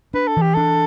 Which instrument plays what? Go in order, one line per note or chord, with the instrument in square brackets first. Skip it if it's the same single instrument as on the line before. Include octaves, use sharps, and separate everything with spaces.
[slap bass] D4 [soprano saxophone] B4
[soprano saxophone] A4
[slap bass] E3 [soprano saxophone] G4
[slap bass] D4 [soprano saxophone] A4